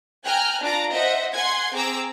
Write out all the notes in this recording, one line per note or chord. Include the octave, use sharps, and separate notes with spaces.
G5 G#5 A#5 F6 F#6
D4 F4 A#5 D6
C5 D#5 E5 F#5
F#5 G#5 C6 G#6
C4 G#4 A#5 D6 E6